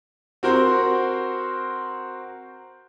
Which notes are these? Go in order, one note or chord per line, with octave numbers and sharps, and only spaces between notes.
C4 F#4 A#4 C5